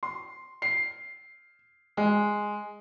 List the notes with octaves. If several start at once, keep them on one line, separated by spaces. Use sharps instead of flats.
C6
C7
G#3